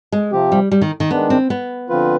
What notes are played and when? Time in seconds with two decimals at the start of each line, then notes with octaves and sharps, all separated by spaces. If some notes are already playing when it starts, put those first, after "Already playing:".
0.12 G#3
0.32 C3 F3 C4 G4
0.52 G3
0.71 G3
0.82 D#3
1.00 D#3
1.10 D#3 G#3 B3 D4
1.30 C4
1.50 B3
1.89 D3 F3 C4 F4 B4